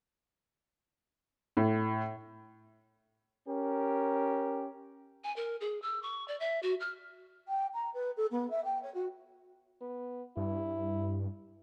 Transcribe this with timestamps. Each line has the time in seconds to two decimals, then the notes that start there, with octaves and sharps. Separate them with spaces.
1.57 A2
3.48 C#4 G4 A#4
5.24 G#5
5.36 A#4
5.61 G#4
5.82 E6
6.03 C#6
6.28 D5
6.40 E5
6.63 F#4
6.80 F6
7.48 G5
7.74 A#5
7.94 B4
8.17 A4
8.31 B3
8.50 E5
8.64 G5
8.82 C#5
8.94 F#4
9.81 B3
10.37 G2 E4